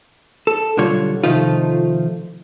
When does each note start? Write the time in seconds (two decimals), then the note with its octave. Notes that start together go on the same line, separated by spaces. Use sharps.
0.47 A4
0.77 B1 D3 G3 F4 C#5
1.24 C3 D#3 F3 A3 D#4 F4